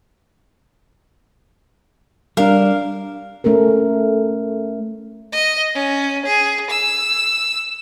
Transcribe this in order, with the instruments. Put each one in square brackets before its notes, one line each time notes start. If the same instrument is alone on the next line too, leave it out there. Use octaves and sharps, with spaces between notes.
[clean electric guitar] G3 D4 [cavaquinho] A#4 F5
[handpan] A3 C#4 A4 A#4
[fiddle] D#5
C#4
G#4
E6